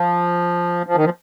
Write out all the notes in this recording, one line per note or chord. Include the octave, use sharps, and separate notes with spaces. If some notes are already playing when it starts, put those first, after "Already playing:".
Already playing: F3
F3
D#3
F3